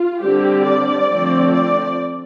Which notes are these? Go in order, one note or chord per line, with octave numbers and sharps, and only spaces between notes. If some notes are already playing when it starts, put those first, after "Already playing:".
Already playing: F4
D3 G3 C4 G4
D5
D3 F3 A3 C4
D5